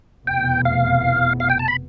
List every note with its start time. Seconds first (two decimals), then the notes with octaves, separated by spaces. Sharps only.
0.27 F1 E2 B2 B3 G5
0.65 F5
1.40 F5
1.50 G5
1.59 A5
1.68 B5